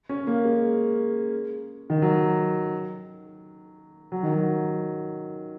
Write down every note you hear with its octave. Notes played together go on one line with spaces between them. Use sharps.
C#4
A#3
G#3
D#3
F#3
F#3
D#3
F#3